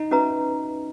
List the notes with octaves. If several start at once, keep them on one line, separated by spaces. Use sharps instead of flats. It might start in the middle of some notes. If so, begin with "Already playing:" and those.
Already playing: D#4
C#4 F#4 B4 E5 A#5